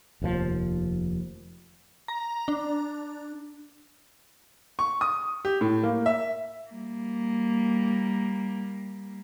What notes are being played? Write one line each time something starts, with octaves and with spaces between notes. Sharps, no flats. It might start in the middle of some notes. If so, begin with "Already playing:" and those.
F1 D#2 A2 F3
A#5
D4
C#6
D#6
G4
A2
A#3
E5
G3 A#3